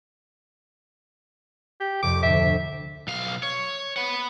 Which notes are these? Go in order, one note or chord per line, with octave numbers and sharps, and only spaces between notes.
G4
C2 F2 C#5 D6
D2 A2 E5
B1 F5
C#5
B4 F#5